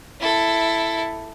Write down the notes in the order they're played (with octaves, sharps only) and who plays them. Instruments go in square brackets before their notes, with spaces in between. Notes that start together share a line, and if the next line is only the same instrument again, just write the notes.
[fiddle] E4 A4